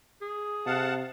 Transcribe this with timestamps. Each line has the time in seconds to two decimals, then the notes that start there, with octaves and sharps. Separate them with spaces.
0.22 G#4
0.66 C3 F5 F#5 A5